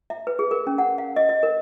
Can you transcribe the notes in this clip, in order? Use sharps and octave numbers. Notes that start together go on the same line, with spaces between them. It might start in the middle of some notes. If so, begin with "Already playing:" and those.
E5
B4
G#4
A#4
C#4
F#5
F5
D#5
D#5
A#4